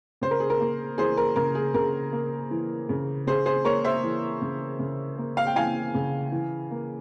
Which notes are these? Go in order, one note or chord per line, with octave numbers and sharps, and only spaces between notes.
C#3 C5
A#4
G#4
A#4
A#3
E3 G#4 C5
A#4
C#3 A#4
G#4
C#3 A#4
A#3
E3
C#3
C#3 G#4 C5
G#4 C5
A#3 A#4 C#5
C5 E5
E3
C#3
C#3
A#3
F5
G5
E3 F5 G#5
C#3
E3
A#3